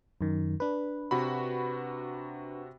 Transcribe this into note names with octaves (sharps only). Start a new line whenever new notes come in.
F#2 D#3
D4 B4
C3 F#4 B5